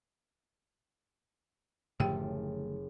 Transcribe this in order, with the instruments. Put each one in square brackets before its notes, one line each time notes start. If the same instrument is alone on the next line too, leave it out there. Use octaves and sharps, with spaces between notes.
[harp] F#1 [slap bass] A2 D3 F3 [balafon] G4 G#4 G5